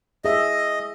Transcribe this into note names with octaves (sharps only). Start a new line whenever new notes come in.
G#4 D#5 E5